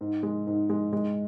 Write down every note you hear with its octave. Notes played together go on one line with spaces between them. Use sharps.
G#2
G#3
G#2
G#3
G#3